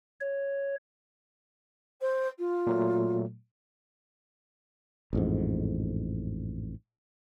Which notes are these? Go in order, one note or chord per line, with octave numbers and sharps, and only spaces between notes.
C#5
C5
F4
A#2 F#3 A3
A1 F2 G#2